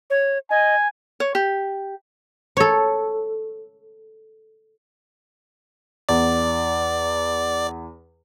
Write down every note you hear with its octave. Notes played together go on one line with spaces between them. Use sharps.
C#5
D#5 G#5
C#5
G4
A4 C#5
E2 D5